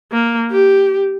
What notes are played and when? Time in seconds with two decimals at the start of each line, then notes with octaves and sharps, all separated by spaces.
0.13 A#3
0.51 G4